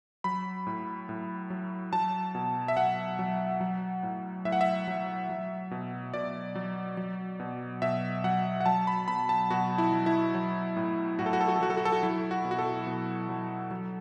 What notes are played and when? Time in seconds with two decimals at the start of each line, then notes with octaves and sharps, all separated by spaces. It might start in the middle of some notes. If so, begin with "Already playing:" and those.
0.24 F#3 B5
0.67 A2
1.09 A2
1.50 F#3
1.93 F#3 A5
2.35 B2
2.68 E5
2.77 B2 F#5
3.19 F#3
3.60 F#3
4.03 A2
4.45 A2 E5
4.52 F#5
4.61 E5
4.88 F#3
5.29 F#3
5.71 B2
6.14 B2 D5
6.55 F#3
6.97 F#3
7.40 B2
7.82 B2 E5
8.24 F#3 F#5
8.61 F#5
8.66 F#3 A5
8.87 B5
9.08 B2 B5
9.29 A5
9.50 B2 F#4
9.78 E4
9.92 F#3
10.06 E4
10.34 F#3
10.77 A2
11.19 A2 F#4
11.26 A4
11.33 F#4
11.41 A4
11.48 F#4
11.56 A4
11.60 F#3 F#4
11.70 A4
11.77 F#4
11.85 A4
11.92 F#4
12.03 F#3 E4
12.31 F#4
12.45 B2
12.51 F#4
12.58 A4
12.87 B2
13.29 F#3
13.71 F#3